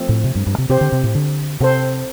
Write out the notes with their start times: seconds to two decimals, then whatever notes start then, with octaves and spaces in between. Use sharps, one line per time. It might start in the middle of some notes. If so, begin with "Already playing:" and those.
Already playing: F3 A3 C4
0.09 A2
0.24 C3
0.35 G2
0.47 G2
0.58 C3
0.69 C3 C4 G4 C5
0.81 D3
0.92 C3
1.04 A2
1.15 D3
1.60 C3 C4 A4 C5